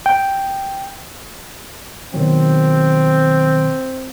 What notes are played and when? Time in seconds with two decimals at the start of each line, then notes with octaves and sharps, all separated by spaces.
0.06 G5
2.14 B2 D#3 F#3 C4